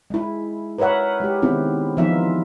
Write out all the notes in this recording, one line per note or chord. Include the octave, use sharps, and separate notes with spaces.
G#3 E4
A#4 B4 C#5 E5 F#5
G#3 G4
D#3 B3 C4 E4
E3 F3 B3 D#4 F4 E5